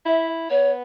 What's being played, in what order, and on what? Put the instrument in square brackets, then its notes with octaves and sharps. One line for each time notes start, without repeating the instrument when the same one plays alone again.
[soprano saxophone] E4 [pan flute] E5
[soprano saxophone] B3 [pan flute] C#5